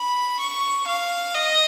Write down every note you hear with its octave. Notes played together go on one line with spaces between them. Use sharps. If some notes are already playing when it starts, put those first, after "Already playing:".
Already playing: B5
C#6
F5
D#5